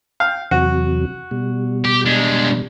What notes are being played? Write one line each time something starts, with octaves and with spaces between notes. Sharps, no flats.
F5 G5
E2 C3 F#3 F#4
B2 G3
G4
G#3 D4